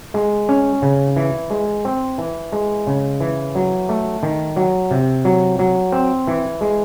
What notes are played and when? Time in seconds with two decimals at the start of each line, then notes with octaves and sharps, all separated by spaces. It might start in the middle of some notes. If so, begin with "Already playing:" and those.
0.14 G#3
0.49 C#4
0.82 C#3
1.16 E3
1.50 G#3
1.85 C4
2.18 E3
2.52 G#3
2.87 C#3
3.20 E3
3.55 F#3
3.89 A3
4.23 D#3
4.56 F#3
4.91 C3
5.25 F#3
5.59 F#3
5.92 C4
6.27 E3
6.61 G#3